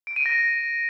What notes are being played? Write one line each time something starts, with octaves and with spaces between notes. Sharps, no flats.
D7
D#7
A#6